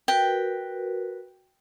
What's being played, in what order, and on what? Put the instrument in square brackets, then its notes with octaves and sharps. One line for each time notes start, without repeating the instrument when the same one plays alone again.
[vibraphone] F#4 A#4 B4 [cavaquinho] G5